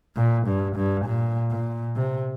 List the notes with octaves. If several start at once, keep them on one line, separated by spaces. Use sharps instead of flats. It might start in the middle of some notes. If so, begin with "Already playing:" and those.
A#2
G2
G2
A#2
A#2
C3